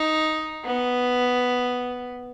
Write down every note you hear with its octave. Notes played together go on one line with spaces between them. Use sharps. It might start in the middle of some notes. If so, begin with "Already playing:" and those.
Already playing: D#4
B3